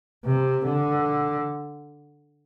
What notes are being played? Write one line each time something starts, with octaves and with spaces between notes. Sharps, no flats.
C3
D3